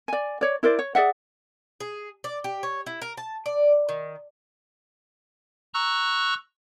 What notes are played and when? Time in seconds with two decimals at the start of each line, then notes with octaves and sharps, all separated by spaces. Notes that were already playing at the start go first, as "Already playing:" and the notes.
0.08 D5 G#5
0.41 C#5 D5
0.63 E4 A#4 C5 D5
0.79 C#5
0.95 G#4 D5 E5 F#5
1.80 G#4
2.24 D5
2.44 G4
2.63 C#5
2.86 E4
3.02 A#4
3.17 A5
3.46 D5
3.89 D#3
5.74 A#5 C#6 E6 F#6